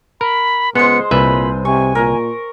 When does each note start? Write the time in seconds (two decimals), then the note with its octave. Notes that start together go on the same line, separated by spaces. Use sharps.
0.21 A#4 B5
0.75 C#2 G#3 B3 C5 C#7
1.11 C2 A#2 B4 E5 G#5 B5
1.65 C3 G#5 C#6
1.95 A#2 A#4